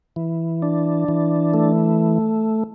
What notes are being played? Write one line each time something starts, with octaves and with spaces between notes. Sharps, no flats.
E3
D4
E3
A3